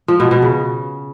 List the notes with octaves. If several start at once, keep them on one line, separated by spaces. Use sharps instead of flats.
F3
B2
B2
C#3